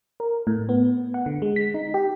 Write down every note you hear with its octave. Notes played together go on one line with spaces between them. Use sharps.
A#4
A2
B3
F#5
D3
G#3
B6
D#4
G4